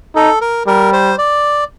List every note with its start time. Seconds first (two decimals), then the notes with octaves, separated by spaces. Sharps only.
0.15 D#4 A4
0.41 A#4
0.67 G3 A#4
0.93 C5
1.18 D5